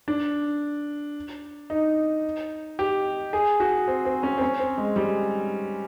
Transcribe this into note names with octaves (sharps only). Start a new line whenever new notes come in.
D4
D#4
G4
G#4
F#4
C4
C4
C#4
C4
C#4
C4
G#3
G3